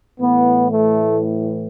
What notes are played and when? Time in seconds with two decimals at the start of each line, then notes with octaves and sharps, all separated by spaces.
0.19 A2 E3 B3
0.71 A3